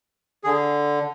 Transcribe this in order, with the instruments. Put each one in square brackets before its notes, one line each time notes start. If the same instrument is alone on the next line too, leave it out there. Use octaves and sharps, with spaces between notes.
[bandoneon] D3 G#4